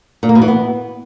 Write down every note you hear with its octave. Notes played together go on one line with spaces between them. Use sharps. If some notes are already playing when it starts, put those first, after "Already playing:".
A#2
A#3
B2
E3
B3